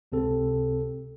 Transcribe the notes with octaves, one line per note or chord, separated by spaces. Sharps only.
C#2 C3 C4 A4